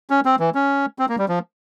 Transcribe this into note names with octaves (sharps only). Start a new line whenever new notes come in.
C#4
C4
E3
C#4
C4
A#3
G3
F3